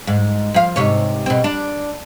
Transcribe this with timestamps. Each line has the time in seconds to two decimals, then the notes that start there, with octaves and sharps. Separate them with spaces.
0.07 G#2
0.54 F3 F5
0.76 G#2 C3 C#5
1.26 B2 C4
1.44 D4